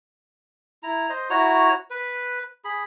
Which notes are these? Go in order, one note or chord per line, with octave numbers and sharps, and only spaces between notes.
E4 A#5
C5 D#5
E4 F#4 C#5 A#5
B4
G#4 B5